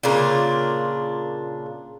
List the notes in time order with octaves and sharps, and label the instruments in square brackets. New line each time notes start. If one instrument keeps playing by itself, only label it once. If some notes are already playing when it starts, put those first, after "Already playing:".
[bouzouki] A#2 C#3 D4 F4